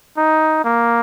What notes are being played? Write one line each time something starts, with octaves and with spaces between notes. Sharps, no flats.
D#4
A#3